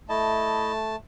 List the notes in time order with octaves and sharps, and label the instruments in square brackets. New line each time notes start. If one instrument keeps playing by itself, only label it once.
[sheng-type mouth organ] A3 A5 [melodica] E4 D#5